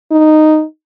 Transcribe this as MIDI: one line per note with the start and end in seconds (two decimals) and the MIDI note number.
0.12 0.63 63